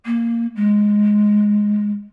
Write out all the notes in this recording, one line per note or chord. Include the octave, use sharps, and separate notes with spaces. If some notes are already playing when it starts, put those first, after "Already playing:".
A#3
G#3